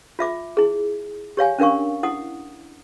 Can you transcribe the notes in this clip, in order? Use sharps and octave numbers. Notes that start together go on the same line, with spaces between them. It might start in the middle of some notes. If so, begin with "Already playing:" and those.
F4 E5 D6
E4 G#4
G4 C#5 F5 G#5
C#4 D4 A#4 F5 C#6
E4 F#5 D#6